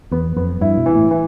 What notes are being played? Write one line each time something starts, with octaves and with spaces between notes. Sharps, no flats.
E2 B3
F2 B3
G2 E4
B2
E3
A2
E3